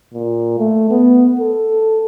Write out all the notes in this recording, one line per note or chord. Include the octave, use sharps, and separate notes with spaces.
A#2
A3
B3
A4